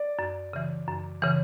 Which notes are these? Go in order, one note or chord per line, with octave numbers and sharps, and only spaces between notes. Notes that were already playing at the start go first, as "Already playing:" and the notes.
Already playing: D5
F#2
C#3 E3
F#2
C#3 E3